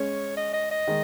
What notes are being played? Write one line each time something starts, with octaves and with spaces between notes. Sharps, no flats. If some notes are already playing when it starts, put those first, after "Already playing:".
Already playing: G#3 C#4 C#5
D#5
D#5
D#5
D#3 G#3